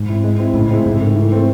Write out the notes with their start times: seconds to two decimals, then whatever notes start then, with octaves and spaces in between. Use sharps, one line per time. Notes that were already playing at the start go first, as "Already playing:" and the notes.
Already playing: G#2
0.08 C4 E4
0.24 G#3
0.39 C4 E4
0.54 A2 C#3
0.70 G#3 C4 E4 G#4
0.85 G#2 C3
1.01 D#3 A3
1.16 E3
1.32 A3 C4